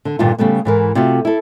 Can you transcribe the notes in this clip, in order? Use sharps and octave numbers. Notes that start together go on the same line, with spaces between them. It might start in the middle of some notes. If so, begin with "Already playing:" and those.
D3
G2 A#2 D3 D#3 F4
C#3 G3 A3 B3
G#2 E3 A#4
C3 A3 F4 F#4
E4 A4